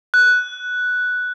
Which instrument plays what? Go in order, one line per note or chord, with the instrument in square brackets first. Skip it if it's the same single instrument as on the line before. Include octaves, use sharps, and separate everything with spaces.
[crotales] F#6